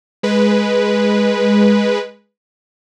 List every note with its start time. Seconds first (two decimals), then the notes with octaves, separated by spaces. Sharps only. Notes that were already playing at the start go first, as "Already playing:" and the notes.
0.23 G#3 B4